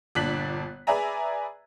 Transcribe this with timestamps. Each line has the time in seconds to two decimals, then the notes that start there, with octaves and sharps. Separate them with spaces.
0.15 G1 A#2 D4 F#6 B6 F#7
0.87 G#4 B4 D5 E5 G#5 A#5